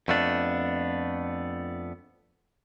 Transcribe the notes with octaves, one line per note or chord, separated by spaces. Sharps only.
F2 A3 B3 D4